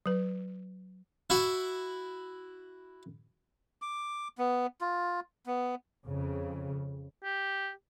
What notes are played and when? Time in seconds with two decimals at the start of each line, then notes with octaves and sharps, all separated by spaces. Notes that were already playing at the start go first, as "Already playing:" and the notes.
0.06 F#3 B4
1.30 E4 F#4
3.82 D6
4.38 B3
4.81 F4
5.46 B3
6.05 F2 C#3
7.23 G4